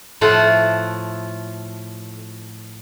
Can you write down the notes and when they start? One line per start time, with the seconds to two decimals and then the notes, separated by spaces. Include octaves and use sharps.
0.21 A2 F3 A3 F4 A4 F#5